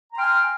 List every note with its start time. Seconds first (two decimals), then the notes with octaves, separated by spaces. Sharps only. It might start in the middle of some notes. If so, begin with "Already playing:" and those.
0.12 A#5
0.14 G5
0.17 C6
0.20 F6
0.23 G#5